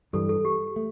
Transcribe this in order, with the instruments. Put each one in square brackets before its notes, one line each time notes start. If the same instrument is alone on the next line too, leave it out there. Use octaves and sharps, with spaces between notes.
[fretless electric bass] G2 E3 G3 [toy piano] A4
[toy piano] A4
G4
[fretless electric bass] A3